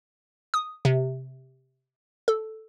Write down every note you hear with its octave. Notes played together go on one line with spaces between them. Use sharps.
D#6
C3
A4